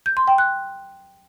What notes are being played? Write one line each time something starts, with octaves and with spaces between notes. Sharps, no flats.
G6
C6
G5
F#6